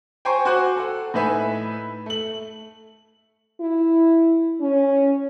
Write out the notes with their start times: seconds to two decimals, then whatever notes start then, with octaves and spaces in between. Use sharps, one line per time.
0.25 C5 G5 G#5 A#5 C6 C#6
0.45 F#4 C5 G#5 D6 F#6
0.77 A4 F#5
1.14 A2 D#4 B4 E5 G#5
2.06 A3 F#7
3.61 E4
4.61 C#4